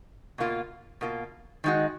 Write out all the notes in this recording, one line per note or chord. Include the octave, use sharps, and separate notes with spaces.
B2 A#3 F4
B2 A#3 F4
D#3 G#3 D#4 F#4